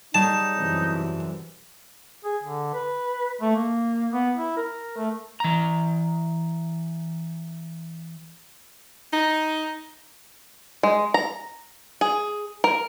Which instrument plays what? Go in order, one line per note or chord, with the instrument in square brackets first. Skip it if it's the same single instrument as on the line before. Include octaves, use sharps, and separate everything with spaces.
[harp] G3 G#4 C#5 [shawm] D#4 [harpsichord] A5
[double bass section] F#2 C3 E3
[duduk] G#4
D3
B4
A3
A#3
B3
E4
A#4
A3
[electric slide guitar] E3 A#5
[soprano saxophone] D#4
[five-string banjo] G#3
A#5
G#4
A#4